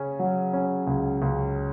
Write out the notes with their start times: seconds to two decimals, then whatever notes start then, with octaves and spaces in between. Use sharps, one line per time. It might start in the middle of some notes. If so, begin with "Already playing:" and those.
Already playing: C#3 C#4
0.19 F#3
0.53 C#4
0.87 C#2
1.22 C#2